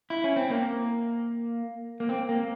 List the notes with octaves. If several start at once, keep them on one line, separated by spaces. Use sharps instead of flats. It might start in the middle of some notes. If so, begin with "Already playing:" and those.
E4
C#4
C4
A#3
A#3
C4
A#3